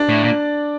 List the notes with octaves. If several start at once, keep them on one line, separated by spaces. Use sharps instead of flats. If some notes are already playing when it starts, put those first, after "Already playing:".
Already playing: D4 D5
A2
A#2